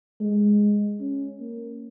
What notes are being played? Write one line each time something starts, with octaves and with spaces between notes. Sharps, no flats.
G#3
C#4
A#3